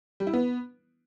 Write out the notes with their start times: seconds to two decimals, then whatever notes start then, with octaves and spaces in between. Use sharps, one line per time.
0.20 G3
0.27 E4
0.33 B3